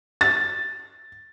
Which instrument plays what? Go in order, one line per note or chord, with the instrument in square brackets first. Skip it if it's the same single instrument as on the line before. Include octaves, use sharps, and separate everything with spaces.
[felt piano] A6